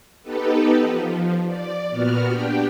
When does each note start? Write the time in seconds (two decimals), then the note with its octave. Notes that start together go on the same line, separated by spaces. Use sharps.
0.23 B3 D#4 G4 A4 B4
0.81 F3
1.45 D5
1.90 A#2 B3 F#4 F6
2.25 D4 G4 G5